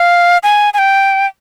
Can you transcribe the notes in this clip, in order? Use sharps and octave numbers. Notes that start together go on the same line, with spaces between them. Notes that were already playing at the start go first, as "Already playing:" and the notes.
Already playing: F5
G#5
G#5
G5